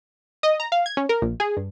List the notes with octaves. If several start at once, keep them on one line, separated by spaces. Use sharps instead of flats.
D#5
A#5
F5
G#6
C#4
A#4
A#1
G#4
G2